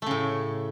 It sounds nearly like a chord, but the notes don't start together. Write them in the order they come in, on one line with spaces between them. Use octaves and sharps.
A3 C#3 A2